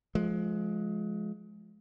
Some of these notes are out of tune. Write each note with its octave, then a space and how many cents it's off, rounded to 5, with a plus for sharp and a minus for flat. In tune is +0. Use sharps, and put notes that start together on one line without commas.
F3 +0 G#3 +25